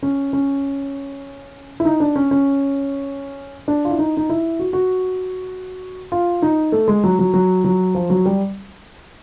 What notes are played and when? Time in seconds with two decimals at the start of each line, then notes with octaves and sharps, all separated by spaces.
0.03 C#4
0.33 C#4
1.80 E4
1.85 D#4
2.00 D4
2.16 C#4
2.31 C#4
3.68 D4
3.85 F4
3.91 E4
3.99 D#4
4.17 D#4
4.30 E4
4.59 F#4
4.73 F#4
6.12 F4
6.42 D#4
6.72 A3
6.88 G#3
7.04 F#3
7.19 F#3
7.34 F#3
7.64 F#3
7.94 F3
8.10 F#3
8.26 G3